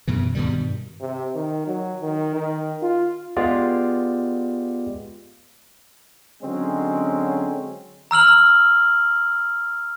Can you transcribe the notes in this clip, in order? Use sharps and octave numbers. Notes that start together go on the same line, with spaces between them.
F#2 B2 E3
G2 B2 D#3 G3
C3
D#3
F#3
D#3
D#3
F4
G#3 B3 F4 G4 D5
D3 F#3 G#3 C4 C#4
A#5 E6 F6 F#7